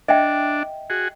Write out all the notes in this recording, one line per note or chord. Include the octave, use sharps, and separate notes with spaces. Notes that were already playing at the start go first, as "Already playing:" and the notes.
D4 D#5 E5 G5
F#4 G#4